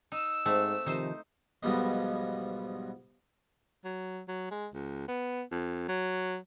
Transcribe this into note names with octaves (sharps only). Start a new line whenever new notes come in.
D#4 E6
G#2 A3 C4 C5
C3 D#3 F3 D#4 C5
B1 G#2 F3 G3 B3 D#5
F#3
F#3
G#3
C#2
B3
F2
F#3